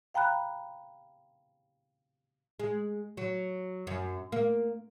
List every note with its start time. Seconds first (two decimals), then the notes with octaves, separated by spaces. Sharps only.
0.14 F5 G5 A#5 B5 F#6
2.60 G#3
3.17 F#3
3.87 F#2
4.32 A#3